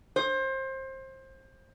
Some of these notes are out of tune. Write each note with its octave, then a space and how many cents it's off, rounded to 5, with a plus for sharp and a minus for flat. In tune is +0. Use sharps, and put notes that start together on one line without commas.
C5 +25